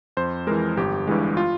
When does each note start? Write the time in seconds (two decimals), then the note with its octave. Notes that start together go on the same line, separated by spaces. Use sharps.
0.17 F2 C5
0.47 E3 G#3 A#4
0.77 G1 G4
1.07 G2 E3 G#3
1.37 F4